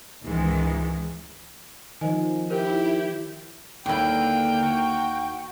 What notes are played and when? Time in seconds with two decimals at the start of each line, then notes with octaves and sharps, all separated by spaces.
0.23 C#2 G#2 D#3 E3 G#3
2.01 D#3 F3 C5 D#5 G#5
2.50 E4 G4 A#4 C5
3.86 D#2 D3 A#3 E4 B4 G5
4.63 F#4